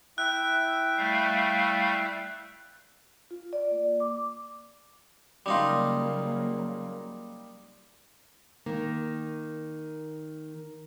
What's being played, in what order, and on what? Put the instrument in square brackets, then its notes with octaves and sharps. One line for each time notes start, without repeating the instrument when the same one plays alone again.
[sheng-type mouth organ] E4 E5 G5 [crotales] F#6
[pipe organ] G3 A3 F5
[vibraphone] F4
D5
A#3
D6
[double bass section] C#3 F#3 A#3 [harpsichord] G3 D#4 F4
[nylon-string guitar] D#3 A#3